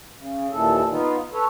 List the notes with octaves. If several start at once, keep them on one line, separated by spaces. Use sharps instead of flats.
C#3
D#2 A#2 E3 A4
B3 D#4 F4
A4 B4 C#5